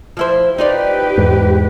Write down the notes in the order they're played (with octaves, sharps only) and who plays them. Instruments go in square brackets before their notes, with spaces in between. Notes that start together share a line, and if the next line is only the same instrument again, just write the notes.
[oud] F3 E4 C5
[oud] D#4 F4 D5 [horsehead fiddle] G4 B4
[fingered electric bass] E2 G#2